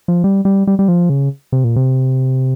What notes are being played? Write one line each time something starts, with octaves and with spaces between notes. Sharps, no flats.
F3
G3
G3
G3
G3
F3
C#3
C3
A#2
C3